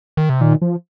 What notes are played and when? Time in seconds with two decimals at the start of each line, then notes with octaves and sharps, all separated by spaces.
0.17 D#3
0.29 C3
0.41 A#2 D#3
0.61 F3